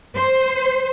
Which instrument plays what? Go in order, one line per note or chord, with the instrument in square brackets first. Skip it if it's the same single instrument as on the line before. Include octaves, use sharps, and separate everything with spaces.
[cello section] C5